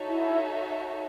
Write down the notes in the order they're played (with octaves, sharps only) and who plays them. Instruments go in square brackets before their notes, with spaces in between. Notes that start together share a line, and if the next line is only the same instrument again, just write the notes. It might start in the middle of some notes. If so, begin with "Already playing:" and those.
Already playing: [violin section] D#4 F#4 A4 C#5 E5
[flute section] E4